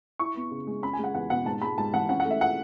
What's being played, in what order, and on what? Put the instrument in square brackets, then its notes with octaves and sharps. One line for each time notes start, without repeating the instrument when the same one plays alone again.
[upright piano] E4 C#6
B3
C#3
G#3
C#4 B5
G#5
G#3
F#5
E2 F#5
B2 F#5
G#2 A5
G#3 B5
G#2 A5
E3 F#5
C#4 F#5
F#5
A3
E5
F#5